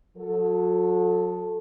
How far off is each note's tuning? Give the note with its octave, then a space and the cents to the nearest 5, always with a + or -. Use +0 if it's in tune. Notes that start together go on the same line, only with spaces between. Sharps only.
F#3 -40 A4 +0